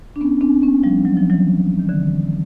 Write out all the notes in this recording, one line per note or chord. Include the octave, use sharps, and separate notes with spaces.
D4
B3 C#4
C4 D4
B3 C#4
F3 G3
F#3
F3
E3 F#3
D#3
D3 E3